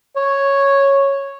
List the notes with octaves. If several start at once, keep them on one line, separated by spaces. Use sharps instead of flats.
C#5